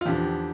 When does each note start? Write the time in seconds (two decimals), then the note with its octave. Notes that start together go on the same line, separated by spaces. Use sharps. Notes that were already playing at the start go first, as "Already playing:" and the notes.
0.01 F4
0.05 E2 D3 F3 G4